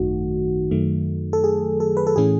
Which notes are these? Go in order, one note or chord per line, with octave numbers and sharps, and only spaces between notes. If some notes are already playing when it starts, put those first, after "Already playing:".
Already playing: G#1 F#2 D#3 A3 D#4 F#4
F#2 D#3 F#3 A3
A4
G#4
A4
B4
A4
A2 E3 A3 C#4 G#4